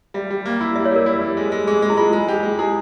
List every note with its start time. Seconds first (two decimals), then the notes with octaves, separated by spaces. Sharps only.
0.14 G3 E5
0.31 G3
0.46 A#3
0.60 E4
0.76 G3 E5
0.85 C#5
0.91 G3 A#4
1.06 E4
1.21 G3
1.37 G#3
1.52 G#3
1.67 G#3 G#4
1.82 G#3
1.90 E4
1.97 G#3 F4
2.13 G#3
2.28 G4
2.43 G#3
2.59 E4 G#4